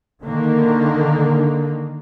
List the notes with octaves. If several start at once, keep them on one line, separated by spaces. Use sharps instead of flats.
D3 D#3 A#3